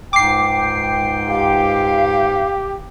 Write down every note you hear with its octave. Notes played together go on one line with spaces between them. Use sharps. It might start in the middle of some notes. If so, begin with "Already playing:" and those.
C#2 G#2 G5 D6 C7
G4 F5